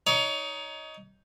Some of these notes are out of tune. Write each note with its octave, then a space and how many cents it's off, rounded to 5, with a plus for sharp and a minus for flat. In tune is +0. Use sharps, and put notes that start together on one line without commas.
D#4 +10 C#5 +25